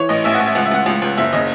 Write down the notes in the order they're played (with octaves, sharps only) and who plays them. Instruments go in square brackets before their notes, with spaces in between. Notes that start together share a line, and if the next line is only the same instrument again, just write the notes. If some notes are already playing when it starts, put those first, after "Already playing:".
Already playing: [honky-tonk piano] E3 C#5
A1 D#5
A1 E5
F#5
A1
E5
C#2 F#5
E5
C#2 F#5
C#2
C#2
F#1 E5
C#3 D#5